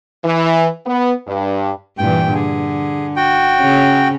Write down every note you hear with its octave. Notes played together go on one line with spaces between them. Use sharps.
E3
B3
G2
G2 A#2 E3 G5
D3 G#4
F#4 G5
C#3 C#4